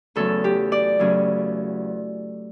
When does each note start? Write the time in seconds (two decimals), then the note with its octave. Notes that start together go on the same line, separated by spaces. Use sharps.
0.16 E2 C#3 F#3 A3 C#4 A4
0.44 G4
0.72 D5
0.99 E2 C#3 F#3 A3 C#4